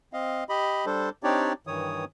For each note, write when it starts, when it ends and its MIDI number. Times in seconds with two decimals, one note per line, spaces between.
0.13 0.44 60
0.13 0.44 75
0.13 0.44 77
0.49 0.85 67
0.49 0.85 75
0.49 0.85 83
0.86 1.09 55
0.86 1.09 62
0.86 1.09 69
0.86 1.09 72
1.23 1.53 60
1.23 1.53 62
1.23 1.53 63
1.23 1.53 67
1.23 1.53 73
1.23 1.53 74
1.67 2.05 43
1.67 2.05 51
1.67 2.05 52
1.67 2.05 73
1.67 2.05 87